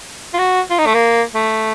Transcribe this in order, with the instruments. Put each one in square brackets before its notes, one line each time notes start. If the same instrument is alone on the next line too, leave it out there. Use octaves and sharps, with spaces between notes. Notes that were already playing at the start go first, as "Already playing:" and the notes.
[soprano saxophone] F4
F#4
F4
D#4
A3
A#3
A3